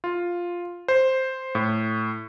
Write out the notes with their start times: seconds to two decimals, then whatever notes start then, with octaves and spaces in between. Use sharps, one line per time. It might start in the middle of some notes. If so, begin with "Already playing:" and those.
0.04 F4
0.88 C5
1.55 A2